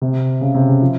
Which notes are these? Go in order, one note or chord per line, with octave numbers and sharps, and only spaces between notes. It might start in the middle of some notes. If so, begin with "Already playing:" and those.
C3
C#3
C3
C#3
F3